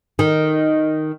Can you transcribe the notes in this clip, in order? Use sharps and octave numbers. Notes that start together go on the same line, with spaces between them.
D#3